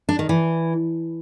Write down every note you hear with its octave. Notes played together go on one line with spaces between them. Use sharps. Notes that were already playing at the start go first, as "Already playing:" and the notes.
D4
D#3
E3